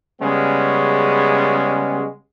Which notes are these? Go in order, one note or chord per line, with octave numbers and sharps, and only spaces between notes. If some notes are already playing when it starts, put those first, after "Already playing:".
C#3 G3 G#3 B3 C#4